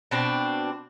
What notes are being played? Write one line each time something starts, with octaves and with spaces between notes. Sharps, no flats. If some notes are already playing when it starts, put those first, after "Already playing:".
B2 C4 D4